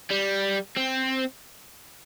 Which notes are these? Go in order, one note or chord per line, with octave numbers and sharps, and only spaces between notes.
G3
C4